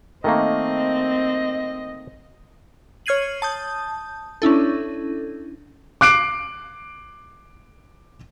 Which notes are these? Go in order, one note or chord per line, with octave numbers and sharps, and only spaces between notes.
D#3 A3 A#3 C4 D#5
C#5 F6 G#6 C7 D#7 F#7
A5 D#6 G6
C#4 D4 E4 A4
D6 F#6 C7 D7